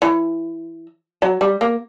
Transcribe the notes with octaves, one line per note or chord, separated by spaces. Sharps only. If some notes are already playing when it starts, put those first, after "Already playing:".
E3
F#3
G3
A#3